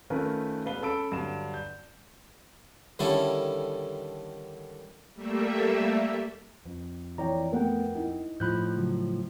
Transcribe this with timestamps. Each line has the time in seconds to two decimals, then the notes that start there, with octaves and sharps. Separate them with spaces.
0.10 D#3 A3 C#4 F4 A#4 B4
0.65 E1 B4 F5 G7
0.82 C#4 A4 B5 E6 D7
1.12 G2 D3 F#3 E7
1.54 G6
2.99 D3 D#3 G3 C#4 E4 A4
5.14 G3 A3 A#3 E5
6.65 F2
7.18 E3 C#5 D5 G5 A#5
7.52 A3 B3 A#4 F#5 G5
7.95 D#4 E4
8.40 A2 F3 B5 F#6 G6
8.77 C#3 F#3